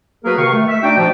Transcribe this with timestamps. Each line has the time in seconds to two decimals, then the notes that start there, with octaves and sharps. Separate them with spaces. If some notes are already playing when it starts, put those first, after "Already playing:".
0.25 F#3 A#3 F#4 G#4 A#4 B4
0.37 C3 D#3 B4 F5 C#6
0.53 A3
0.68 E5
0.83 A3 D4 D#4 F#4 D5 G5
0.97 B2 F3